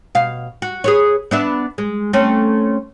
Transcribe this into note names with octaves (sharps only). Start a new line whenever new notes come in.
B2 F5
F#4
G#4 B4 C#5
B3 D4 E5
G#3
A3 C4 C#4